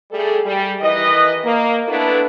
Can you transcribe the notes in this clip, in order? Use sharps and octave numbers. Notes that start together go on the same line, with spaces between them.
G3 A3 G#4 A4
G3
D#3 E3 B4 D#5
A#3
A3 B3 D4 E4 A4 B4